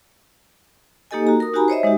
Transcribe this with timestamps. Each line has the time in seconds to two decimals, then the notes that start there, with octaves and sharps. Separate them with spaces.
1.11 A#3 D#4 G4 A4 D#5 G#5
1.27 F#4 A#5
1.40 A#4 D#6
1.53 D#4 F#4 G4 G#5 A#5 B5
1.68 C5 C#5 D#5 E5
1.83 G#3 D#4 F#4 G4